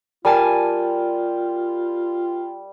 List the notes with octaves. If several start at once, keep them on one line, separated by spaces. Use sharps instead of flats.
G3 F4 A#4 G#5 A5